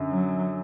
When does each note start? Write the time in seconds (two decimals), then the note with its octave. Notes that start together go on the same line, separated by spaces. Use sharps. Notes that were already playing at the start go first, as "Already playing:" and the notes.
Already playing: F#2 D3
0.11 F#3